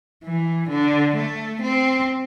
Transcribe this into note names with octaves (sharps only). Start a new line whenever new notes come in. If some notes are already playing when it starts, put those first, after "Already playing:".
E3
D3
A3
C4